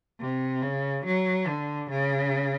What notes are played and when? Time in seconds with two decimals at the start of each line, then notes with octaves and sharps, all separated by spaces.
0.20 C3
0.62 C#3
1.05 F#3
1.47 D3
1.90 C#3